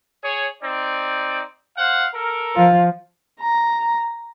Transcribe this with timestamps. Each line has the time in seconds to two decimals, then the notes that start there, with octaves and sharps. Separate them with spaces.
0.24 G#4 C#5
0.63 C4 D#4 D5
1.77 C5 F5 F#5
2.14 A4 A#4
2.56 F3 F4
3.40 A#5